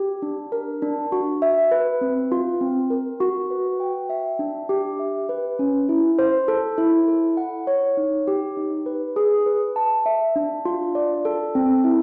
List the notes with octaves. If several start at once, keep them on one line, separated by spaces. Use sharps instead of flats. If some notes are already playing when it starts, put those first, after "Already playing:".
Already playing: G4
D4
A#4
D4
F#4
E5
B4
C4
F4
C4
A#4
F#4
B4
G5
E5
D4
G4
E5
B4
C#4
E4
C5
A4
E4
A4
F#5
C#5
D#4
G4
D#4
B4
G#4
B4
A5
E5
D4
F4
D5
A4
C4
E4